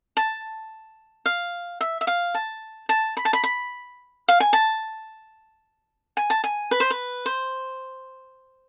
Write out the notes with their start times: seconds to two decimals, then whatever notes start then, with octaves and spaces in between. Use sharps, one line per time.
0.17 A5
1.26 F5
1.81 E5
2.01 E5
2.07 F5
2.34 A5
2.89 A5
3.17 B5
3.25 A5
3.33 B5
3.44 B5
4.28 F5
4.40 G#5
4.53 A5
6.17 G#5
6.30 A5
6.44 G#5
6.71 B4
6.80 C5
6.90 B4
7.26 C5